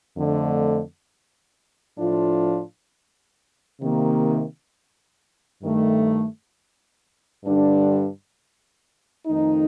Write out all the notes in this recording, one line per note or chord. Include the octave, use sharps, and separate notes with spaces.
F2 D3 A3
A2 F3 A3 D4 F4
C3 D#3 A#3
G2 D#3 A3
G2 D3 G3 D4
F2 D#3 A3 D#4